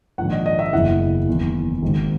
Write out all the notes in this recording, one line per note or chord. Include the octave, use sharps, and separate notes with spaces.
A#1 G#2 D#3 F#5
D#5
D#5
E5
F#1 E2 C#3 E3 F#5
F#1 E2 D#3
G#1 G#2 D#3